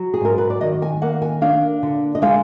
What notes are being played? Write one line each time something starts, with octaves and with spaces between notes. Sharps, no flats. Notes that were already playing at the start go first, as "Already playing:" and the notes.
Already playing: F#3
G#4
G#2 A#4
B4
D5
D#3 D#5
G#5
A#3 F#5
G#5
D4 F5
D3
D#5
G#3 F5